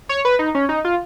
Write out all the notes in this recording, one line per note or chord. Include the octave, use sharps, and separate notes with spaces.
C#5
B4
D#4
C#4
D#4
F4